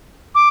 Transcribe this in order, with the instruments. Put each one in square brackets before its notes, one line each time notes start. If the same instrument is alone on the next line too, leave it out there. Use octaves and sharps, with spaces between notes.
[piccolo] D6